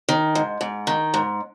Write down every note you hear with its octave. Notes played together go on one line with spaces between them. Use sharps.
D#3
G#2
G#2
D#3
G#2